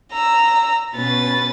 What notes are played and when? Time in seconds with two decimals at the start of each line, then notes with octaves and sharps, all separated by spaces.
0.11 A#5 E6
0.95 B2 C#4 B4 A6